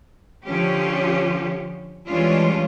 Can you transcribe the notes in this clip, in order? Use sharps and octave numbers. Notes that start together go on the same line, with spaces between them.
D3 F3 C#4 F4 G4
E3 G3 G#3 C#4 D4 F4